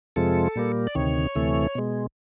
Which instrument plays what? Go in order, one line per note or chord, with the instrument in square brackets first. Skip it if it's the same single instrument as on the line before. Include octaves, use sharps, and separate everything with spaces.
[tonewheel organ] F2 C3 F3 G#3 A4
A#2 G3 A#3
D5
D2 C3 D#3 C#5
D2 C3 E3 A3
B2 G#3